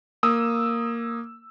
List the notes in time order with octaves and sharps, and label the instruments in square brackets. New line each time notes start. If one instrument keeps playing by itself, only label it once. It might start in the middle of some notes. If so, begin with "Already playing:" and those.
[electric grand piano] A#3 D#6 E6